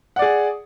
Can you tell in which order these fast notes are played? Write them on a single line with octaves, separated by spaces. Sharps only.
F#5 D5 G#4